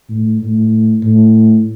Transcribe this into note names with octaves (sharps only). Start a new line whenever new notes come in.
A2
A2
A2